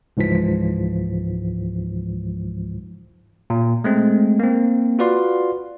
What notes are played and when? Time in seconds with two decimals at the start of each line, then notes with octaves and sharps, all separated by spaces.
0.17 C#2 G#2 E3 F3 B6
3.50 A#2
3.84 G#3 A3 C4
4.40 A#3 C4
4.99 F4 F#4 B4 D5 F5 C6